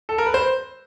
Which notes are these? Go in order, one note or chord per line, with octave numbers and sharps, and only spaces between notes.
A4
A#4
B4
C5